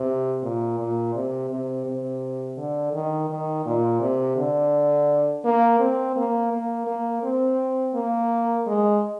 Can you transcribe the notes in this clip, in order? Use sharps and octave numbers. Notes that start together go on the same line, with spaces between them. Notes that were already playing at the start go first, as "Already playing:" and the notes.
Already playing: C3
A#2
A#2
C3
C3
C3
D3
D#3
D#3
A#2
C3
D3
A#3
C4
A#3
A#3
A#3
C4
A#3
G#3